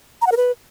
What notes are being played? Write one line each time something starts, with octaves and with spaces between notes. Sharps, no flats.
A#5
F#5
A#4
B4